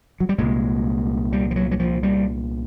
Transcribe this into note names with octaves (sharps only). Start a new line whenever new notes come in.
F#3
G3
C2 A#2 G#3
G3
F3
F#3
F#3
F3
G3